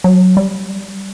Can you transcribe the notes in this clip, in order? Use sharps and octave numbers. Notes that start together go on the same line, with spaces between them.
F#3
G3